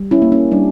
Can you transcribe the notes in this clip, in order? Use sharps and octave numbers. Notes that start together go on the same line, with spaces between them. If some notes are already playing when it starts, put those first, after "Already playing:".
Already playing: G3
C#4 E4
A#3
C#4
G3 D4